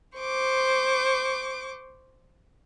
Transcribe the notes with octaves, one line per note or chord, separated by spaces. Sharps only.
C5 C#6 D6